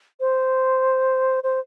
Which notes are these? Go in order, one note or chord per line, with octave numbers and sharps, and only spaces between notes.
C5
C5